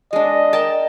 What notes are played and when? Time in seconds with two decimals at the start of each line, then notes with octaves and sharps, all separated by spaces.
0.13 G#3 D4 D#5
0.53 A#4 G5 A5